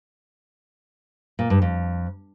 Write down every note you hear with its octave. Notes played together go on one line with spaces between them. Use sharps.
A#2
G2
F2